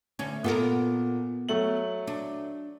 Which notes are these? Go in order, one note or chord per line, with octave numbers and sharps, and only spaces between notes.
D2 C#4
A#2 B3 A4 A#4
F#3 A3 F#7
D4